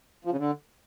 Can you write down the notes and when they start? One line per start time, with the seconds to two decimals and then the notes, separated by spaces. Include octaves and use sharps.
0.25 F3
0.31 C#3
0.38 D3